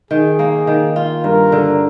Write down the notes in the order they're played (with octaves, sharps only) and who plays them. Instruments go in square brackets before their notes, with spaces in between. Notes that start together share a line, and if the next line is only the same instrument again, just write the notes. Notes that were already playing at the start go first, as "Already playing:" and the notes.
[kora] D#3 [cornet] G#4
[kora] A#3
D#3
F4
[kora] G2 [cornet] A#4
[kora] D3